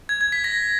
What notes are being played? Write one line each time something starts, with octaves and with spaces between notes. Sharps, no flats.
G#6
G#6
B6
A#6